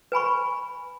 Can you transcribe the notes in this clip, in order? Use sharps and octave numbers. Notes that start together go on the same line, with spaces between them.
B4 G#5 B5 C#6